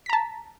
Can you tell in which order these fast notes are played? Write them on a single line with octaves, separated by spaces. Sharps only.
B6 A#5 A5